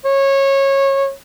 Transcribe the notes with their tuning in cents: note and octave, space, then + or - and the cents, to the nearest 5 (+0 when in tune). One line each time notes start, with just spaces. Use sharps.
C#5 -20